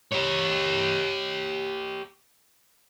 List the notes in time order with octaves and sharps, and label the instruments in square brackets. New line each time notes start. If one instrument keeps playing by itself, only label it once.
[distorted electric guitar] G4 C#5